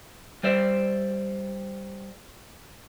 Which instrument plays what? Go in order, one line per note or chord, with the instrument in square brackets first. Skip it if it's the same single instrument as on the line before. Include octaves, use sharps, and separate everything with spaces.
[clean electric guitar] G3 C5 D5 E5